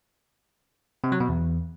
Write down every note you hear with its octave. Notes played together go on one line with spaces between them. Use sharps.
C3
F#3
B2
E2